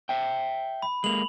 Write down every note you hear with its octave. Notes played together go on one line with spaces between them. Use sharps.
E5 G5
B5
G#3 A#3 F7 F#7